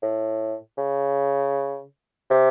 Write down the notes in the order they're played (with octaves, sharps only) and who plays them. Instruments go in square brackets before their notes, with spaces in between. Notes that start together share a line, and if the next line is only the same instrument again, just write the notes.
[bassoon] A2
C#3
C3